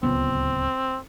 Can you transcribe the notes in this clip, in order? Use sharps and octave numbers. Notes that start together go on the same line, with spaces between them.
D1 C#2 B3 C4